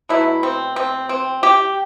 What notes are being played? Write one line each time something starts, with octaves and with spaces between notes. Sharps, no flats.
B2 F#3 A3 E4
C4
C4
C4
G4